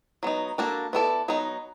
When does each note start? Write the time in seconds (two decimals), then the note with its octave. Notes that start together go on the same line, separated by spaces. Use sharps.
0.23 F#3 B3 D#4
0.58 A#3 D4 F#4 A4
0.93 B3 E4 A4 D5
1.28 F#3 B3 D#4